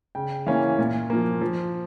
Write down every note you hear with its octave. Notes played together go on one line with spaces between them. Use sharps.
C#3 G5
E3 A#3 C#4 F5
A#2
F3 A#3
F3